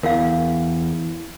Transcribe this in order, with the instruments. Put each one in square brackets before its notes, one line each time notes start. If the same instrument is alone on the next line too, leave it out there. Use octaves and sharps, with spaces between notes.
[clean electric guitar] E2 [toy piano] A#4 F5